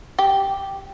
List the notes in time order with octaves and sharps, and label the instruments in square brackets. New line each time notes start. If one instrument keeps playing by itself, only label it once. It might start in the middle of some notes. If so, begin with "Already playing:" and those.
[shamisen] G4